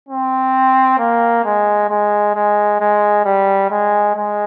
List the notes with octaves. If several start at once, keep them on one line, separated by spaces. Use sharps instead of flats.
C4
A#3
G#3
G#3
G#3
G#3
G3
G#3
G#3